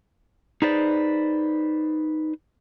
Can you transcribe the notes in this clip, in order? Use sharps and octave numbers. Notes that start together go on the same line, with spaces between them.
D#4 G#4 B4 C5 D5